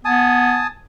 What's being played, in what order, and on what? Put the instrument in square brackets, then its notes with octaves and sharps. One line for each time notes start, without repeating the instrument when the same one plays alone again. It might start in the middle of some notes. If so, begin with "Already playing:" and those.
[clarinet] B3 [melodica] G#5 A5 D#6